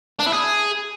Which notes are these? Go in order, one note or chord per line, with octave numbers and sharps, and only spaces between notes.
D4
E4
G#4